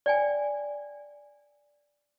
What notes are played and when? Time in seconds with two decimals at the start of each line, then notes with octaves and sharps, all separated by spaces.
0.06 D5 G5 G#5